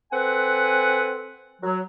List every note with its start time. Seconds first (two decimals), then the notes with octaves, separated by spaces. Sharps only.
0.12 C4 A4 B4 F#5 G#5
1.62 F#3